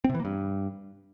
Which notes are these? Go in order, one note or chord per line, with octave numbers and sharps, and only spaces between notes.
C4
C3
E3
A#3
G2